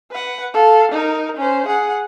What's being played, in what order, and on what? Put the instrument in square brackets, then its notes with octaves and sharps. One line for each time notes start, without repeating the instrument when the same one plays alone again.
[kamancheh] B4 F#5
A4 F5
D#4 A#4
C#4 C5
G#4 F#5